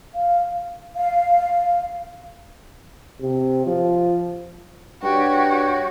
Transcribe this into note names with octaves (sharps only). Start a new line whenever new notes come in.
F5
F5
C3
F3
G2 F#4 G4 C#5 G5